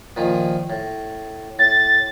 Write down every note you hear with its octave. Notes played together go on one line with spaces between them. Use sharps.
A#2 D#3 F3
A2
A2 A6